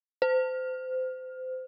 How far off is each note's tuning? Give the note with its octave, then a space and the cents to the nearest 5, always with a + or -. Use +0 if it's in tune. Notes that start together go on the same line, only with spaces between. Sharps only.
C5 -30